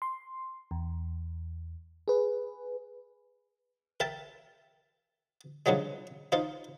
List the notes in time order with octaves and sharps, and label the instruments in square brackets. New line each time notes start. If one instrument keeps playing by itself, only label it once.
[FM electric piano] C6
E2
G#4 B4
[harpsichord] A#4 E5 G5 A5
G2 C#3 F3 F#3 G#3
D#4 F4 C5